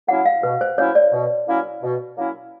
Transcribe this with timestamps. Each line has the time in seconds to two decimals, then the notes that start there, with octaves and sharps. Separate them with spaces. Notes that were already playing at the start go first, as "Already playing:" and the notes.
0.08 F#3 A#3 C#4 E4 F#5
0.26 F5
0.43 B2 B4
0.61 C5
0.78 F#3 A#3 C#4 E4 C#5
0.95 D5
1.12 B2
1.47 F#3 A#3 C#4 E4
1.82 B2
2.17 F#3 A#3 C#4 E4